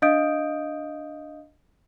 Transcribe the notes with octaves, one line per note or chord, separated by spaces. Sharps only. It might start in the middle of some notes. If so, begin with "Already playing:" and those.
D4 D#5 F5 D#6 G6 D7